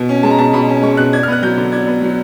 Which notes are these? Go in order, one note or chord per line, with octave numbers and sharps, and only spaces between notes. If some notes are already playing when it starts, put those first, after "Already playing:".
Already playing: B2
C#4
G#3 A5
A#5
B2 A5
B2 B5
C#4
G#3 C#6
B2 F#6
D4 G#6
F6
B3 F#6
F#3 G6
D3
D4 G#6
B3
F#3